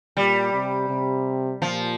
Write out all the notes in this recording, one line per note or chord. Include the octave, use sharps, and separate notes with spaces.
A#2 G3
C3
C3
A#2 F3